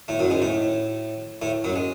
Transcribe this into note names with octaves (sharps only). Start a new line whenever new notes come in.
A2 A3
F#2 F#3
G#2 G#3
A2 A3
A2 A3
F#2 F#3
G#3